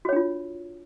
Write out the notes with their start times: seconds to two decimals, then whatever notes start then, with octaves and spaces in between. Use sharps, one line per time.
0.05 F#4
0.09 C#5
0.13 D4
0.16 F4